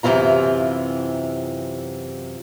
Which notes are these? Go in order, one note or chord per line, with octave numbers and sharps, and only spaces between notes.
F#2 C3 E3 F4 A#5